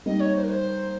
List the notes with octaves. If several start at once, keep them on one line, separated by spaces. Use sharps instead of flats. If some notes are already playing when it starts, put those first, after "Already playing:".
G3 A#3 D#4 D#5
C#5
C5
A#4
C5